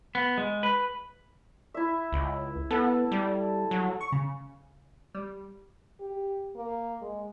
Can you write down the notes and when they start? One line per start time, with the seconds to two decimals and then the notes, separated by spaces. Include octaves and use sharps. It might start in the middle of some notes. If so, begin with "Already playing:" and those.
0.15 B3
0.38 G#3
0.63 B4
1.74 E4 E5
2.13 C#2
2.71 B3 A4
3.11 G3
3.71 F#3
4.01 C#6
4.12 C#3
5.15 G3
6.00 G4
6.56 A#3
7.01 G#3